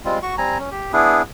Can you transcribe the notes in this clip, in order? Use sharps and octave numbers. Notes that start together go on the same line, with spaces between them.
G3 G#3 C4 F4
F#4 C#6
G3 C4 G#5 A#5
C#4
G4
B3 D4 E4 G#4